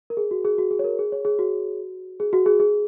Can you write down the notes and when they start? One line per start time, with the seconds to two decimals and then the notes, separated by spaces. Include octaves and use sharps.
0.10 A#4
0.17 G#4
0.31 F#4
0.45 G#4
0.58 F#4
0.71 G#4
0.79 C#5
0.84 A#4
0.99 G#4
1.12 C#5
1.25 G#4
1.39 F#4
2.20 G#4
2.33 F#4
2.46 G#4
2.60 G#4